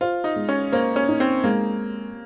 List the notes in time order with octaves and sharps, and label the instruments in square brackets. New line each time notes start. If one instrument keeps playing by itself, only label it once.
[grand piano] F4 [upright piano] C5
[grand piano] D#4
[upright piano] G#3
[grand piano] C#4
[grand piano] A#3 [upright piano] C5
[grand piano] C#4
[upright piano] D#4
[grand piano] C4
[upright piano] G#3 [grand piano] A#3